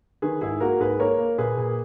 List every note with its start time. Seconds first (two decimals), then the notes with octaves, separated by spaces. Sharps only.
0.22 D#3 G#4 B4
0.41 G#2 E4 G#4
0.60 A#3 F#4 A#4
0.80 G#2 G#4 B4
0.99 A#3 A#4 C#5
1.18 A#3
1.38 A#2 G#4 B4
1.57 A#2